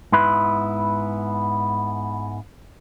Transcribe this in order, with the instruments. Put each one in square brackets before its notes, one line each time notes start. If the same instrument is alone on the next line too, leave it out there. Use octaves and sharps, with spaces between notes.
[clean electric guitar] G#2 B3 E4 B4 C6